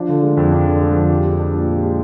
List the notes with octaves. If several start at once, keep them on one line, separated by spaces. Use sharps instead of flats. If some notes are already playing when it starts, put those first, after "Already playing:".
Already playing: F3 D4
D3
G#3
F2
D4
D3
G#3
F2
G4
G#3
D4
A#2
G4
G#3